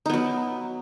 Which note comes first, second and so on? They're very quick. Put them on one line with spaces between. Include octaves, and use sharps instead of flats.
D#4 B3 F#3